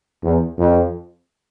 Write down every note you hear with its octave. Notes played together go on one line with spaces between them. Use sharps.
E2
F2